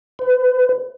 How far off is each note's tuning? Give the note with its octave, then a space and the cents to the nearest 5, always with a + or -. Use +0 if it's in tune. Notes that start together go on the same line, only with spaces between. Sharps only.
B4 +35